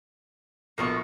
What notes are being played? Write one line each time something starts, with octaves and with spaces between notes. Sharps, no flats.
A#1 B2 A#3 B3 C#6